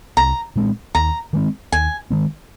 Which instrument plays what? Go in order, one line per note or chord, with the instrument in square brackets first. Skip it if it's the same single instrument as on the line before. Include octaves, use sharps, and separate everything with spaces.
[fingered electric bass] C2 [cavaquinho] A#5
[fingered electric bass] A#2 G#3 C4
[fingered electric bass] D#2 [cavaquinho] A#5
[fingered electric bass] D#3 G#3 C4
[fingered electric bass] D#2 [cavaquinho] G#5
[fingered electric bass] D#3 G#3 C4